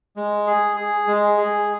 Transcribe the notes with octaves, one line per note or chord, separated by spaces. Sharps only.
G#3
G#4
G#4
G#3
G#4